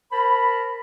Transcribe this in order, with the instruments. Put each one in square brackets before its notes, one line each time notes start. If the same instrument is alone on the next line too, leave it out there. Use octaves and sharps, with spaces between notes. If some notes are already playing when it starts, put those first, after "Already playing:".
[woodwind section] A#4 C5 A5 B5